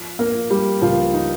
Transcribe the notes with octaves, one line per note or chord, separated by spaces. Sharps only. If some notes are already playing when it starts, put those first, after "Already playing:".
Already playing: F3
A#3 A#4
F3
G3 G4
C#2 F3 F4
D#4